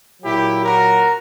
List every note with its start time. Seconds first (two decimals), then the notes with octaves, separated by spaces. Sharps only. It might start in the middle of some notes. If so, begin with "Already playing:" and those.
0.22 A#2 F#3 E4 G4
0.63 F#4 A#4